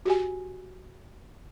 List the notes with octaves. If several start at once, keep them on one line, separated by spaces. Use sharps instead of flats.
F#4 G4 G#5